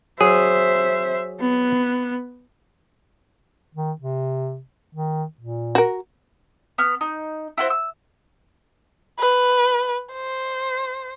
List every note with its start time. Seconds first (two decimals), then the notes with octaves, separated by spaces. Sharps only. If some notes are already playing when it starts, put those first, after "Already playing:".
0.21 F#3 G#4 C5 E5
1.41 B3
3.75 D#3
4.01 C3
4.95 D#3
5.41 A#2
5.75 F#4 A#4
6.78 B3 F6
7.01 D#4
7.58 E4 F#4 C5
7.70 E6
9.19 B4
10.13 C5